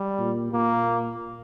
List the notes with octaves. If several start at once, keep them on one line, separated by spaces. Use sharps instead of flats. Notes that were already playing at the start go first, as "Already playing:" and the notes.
Already playing: G3
A#2
A#2 A#3